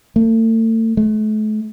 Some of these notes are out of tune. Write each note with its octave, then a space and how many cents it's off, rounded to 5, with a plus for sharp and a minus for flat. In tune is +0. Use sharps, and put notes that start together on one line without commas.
A3 +40
A3 -40